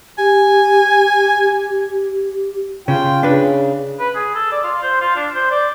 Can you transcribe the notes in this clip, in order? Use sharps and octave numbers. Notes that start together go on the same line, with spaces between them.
G4 G#5
C#3 F4 G5
C#3 D4 B4
B4
G#4
A4
D5
F4
C5
F4
D4
C5
D5